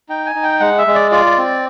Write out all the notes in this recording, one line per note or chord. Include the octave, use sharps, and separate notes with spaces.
D#4 G5
G#5
D#4
G5
G#3 F#5
E5
G#3
D5
F4 D5
C4